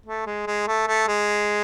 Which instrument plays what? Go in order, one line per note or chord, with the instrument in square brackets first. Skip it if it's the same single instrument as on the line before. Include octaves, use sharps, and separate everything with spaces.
[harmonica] A3
G#3
G#3
A3
A3
G#3